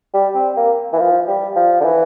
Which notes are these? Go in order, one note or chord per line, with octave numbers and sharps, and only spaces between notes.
G3
C4
A#3
E3
F3
G3
F3
D3
E3